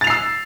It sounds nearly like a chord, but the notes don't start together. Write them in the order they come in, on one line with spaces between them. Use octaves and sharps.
A6 F7 C7 E6